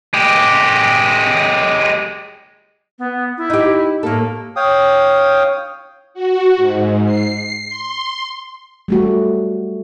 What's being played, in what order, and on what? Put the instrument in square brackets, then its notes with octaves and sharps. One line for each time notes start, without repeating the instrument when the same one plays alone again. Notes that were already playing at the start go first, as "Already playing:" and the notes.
[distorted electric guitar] G#3 G4
[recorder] B3
E4
[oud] D#4 G4
[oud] A2 A4 [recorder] A#3
[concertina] C#5 F5 G5 D#6
[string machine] F#4
G#2
C7
C6
[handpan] G3 A3 F#4